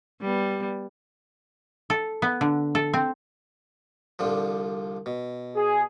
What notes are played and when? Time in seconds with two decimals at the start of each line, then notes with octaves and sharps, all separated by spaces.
0.21 G3 B3
1.90 A4
2.22 B3
2.41 D3
2.75 A4
2.94 C4
4.19 C2 D3 F3
5.06 B2
5.55 G#4